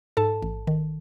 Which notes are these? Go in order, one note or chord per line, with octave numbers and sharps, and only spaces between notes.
G#2 A4 A5
A1
D#3